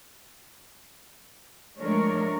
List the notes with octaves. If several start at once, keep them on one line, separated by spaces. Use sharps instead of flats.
F3 G#3 A3 D4 A#4 C#5